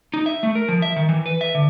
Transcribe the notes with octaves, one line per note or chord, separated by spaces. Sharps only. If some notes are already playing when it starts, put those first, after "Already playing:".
D#4
E5
A3
A#4
F3
E5
D#3
E3
B4
E5
D3